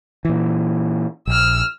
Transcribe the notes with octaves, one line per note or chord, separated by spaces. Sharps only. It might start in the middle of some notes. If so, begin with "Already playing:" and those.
A#2 E3
A#1 E6 F6